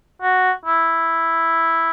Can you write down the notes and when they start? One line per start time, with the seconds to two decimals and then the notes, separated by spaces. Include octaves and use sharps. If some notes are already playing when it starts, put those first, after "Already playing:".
0.22 F#4
0.65 E4